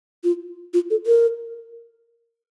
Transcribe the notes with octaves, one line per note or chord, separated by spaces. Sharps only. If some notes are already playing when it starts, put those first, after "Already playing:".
F4
F4
A4
A#4